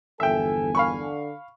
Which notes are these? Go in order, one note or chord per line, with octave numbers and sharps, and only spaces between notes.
G1 E2 F3 A4 E5 G5 G#5
D3 F5 B5 C#6